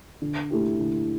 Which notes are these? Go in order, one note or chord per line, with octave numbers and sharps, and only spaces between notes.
D3
A3 E4 G4
D3